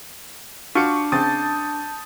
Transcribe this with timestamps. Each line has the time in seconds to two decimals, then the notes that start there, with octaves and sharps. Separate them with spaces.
0.75 D4 F4 F#4 C#6 D6 C#7
1.12 C#3 C4 A5 D#6 G6 A6